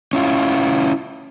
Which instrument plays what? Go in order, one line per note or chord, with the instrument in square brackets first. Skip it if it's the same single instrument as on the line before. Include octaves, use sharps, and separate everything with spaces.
[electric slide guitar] C#4 E4 F4